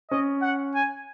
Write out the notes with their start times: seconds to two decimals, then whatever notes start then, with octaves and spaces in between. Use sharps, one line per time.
0.11 C#4 D#5
0.42 F#5
0.75 G#5